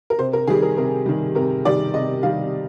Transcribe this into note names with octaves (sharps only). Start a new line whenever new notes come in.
A#4
C3 C5
A#4
D#3 G3 G#4
A#4
C3 A#4
D#3 G3
C3 A#4
D#3 G3 D5
C3 D#5
D#3 G3 F5